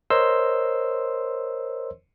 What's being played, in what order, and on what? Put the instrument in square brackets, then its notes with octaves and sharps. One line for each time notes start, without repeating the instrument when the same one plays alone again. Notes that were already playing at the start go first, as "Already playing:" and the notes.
[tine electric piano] A#4 C5 C#5 D#5 C6 E6